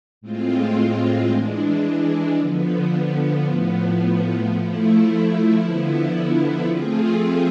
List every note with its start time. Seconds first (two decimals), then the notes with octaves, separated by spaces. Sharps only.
0.21 A2 G#3 C4 F4
1.29 E3 G#3 D4
2.37 D3 F3 B3
3.44 A2 F3 B3
4.52 F3 A3 E4
5.59 D3 F3 B3 E4
6.67 F3 A3 C4 F4 G#4